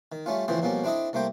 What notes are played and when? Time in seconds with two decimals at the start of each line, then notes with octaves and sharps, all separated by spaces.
0.12 D#3
0.26 G3 A3 C#4 F4
0.48 C#2 A2 E3 F3 C4 C5
0.62 B2 F3 G3 A#3 C#4
0.84 C4 D4 E4 A4 D#5
1.13 C2 A3 A#3 C5 G5